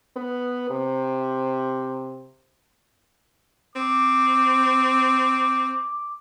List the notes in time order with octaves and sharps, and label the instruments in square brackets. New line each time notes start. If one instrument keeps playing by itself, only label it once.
[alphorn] B3
C3
[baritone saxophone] C4 [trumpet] D6